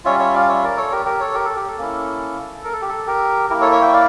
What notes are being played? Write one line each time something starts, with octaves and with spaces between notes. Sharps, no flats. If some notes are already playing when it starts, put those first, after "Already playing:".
G3 C#4 F4 C#5 E5
C#5 E5
D5 F5
C#5 E5
A#4 D5
A4 C#5
G4 A#4
G4 A#4
A4 C#5
G4 A#4
A4
G4
A4
A#3 C#4 E4
A#4
A4
G4
A4
G4 A#4
A#3 E4 G4 A#4
A4 C#5
C#5 E5
E5 G5
D5 F5